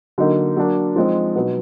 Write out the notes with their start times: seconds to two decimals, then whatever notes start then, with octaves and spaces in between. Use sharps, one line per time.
0.18 D3 F#3 A#3 D#4
0.57 F#3 A#3 D4
0.96 F3 G#3 C4 D#4
1.35 B2 F#3 B3 D#4